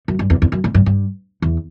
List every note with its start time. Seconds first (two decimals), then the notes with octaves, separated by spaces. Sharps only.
0.08 F#2
0.19 G2
0.30 E2
0.42 E2
0.52 F#2
0.64 A2
0.74 G2
0.86 G2
1.42 E2